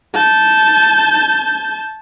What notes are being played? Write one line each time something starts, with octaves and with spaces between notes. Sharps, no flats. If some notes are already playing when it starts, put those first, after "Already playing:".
A5 G6